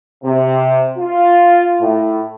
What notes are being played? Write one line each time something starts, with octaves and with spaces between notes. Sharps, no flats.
C3
F4
A2